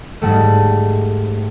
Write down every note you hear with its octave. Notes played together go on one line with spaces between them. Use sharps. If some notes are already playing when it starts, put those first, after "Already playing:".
G#2 G3 A3